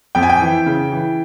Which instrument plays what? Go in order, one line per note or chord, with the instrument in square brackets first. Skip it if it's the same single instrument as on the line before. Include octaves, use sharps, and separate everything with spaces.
[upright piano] F2 G5
G#5
G5
E3
C#3
E3